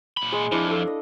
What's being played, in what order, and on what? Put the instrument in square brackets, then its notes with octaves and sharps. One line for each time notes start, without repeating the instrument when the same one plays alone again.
[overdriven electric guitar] A#2 B5
[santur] G#3
[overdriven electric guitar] F2 [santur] D4 E4
[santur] A4 F5
D#5